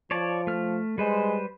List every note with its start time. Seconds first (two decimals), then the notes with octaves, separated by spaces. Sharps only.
0.11 F3 C#5 D5 A5
0.47 A3 F6
0.98 G3 G#3 B4 C5